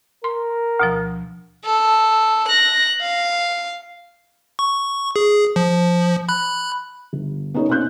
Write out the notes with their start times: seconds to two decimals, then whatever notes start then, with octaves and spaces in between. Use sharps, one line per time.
0.24 A#4 C6
0.80 D2 B2 F3
1.65 A4
2.48 F#6 A#6
3.02 F5
4.59 C#6
5.16 G#4
5.56 F3
6.29 B5 F#6
7.13 G1
7.54 B3 C#4 D#4 A4 A#4 C#5
7.68 B2 C4 C#4 D#4 F#6 G6